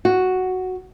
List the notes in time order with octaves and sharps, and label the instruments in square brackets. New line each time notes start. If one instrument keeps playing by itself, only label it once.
[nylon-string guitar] F#4